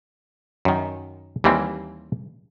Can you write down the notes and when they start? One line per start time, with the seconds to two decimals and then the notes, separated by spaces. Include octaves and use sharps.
0.65 F#2 D#3
1.44 D#2 E3 G3 A#3 C4